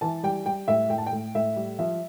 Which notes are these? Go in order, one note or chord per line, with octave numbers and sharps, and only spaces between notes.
E3 A5
G3 G5
G3 G5
A2 E5
A2 G5
A5
G5
A2
A2 E5
G3
F3 E5